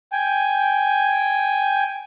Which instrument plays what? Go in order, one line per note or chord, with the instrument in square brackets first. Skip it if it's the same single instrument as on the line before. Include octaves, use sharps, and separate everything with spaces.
[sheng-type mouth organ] G5 G#5